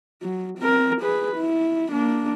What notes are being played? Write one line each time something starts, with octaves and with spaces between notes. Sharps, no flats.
F#3
C4 A#4
G#4 B4
E4
A#3 D4